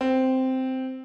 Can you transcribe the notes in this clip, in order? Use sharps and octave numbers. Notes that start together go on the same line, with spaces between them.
C4